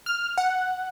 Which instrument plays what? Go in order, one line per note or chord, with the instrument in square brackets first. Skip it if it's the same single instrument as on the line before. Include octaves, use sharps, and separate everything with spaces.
[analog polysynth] F6
F#5